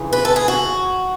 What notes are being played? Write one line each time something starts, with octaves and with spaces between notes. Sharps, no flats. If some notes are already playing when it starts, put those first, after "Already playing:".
Already playing: F2 C#3 E3
B4
A4
G#4
F#4